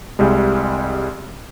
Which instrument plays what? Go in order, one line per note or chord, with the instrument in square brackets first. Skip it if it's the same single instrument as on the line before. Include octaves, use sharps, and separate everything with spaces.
[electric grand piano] C2 G3 G#3